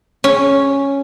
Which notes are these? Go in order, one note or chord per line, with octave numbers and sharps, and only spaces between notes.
C#4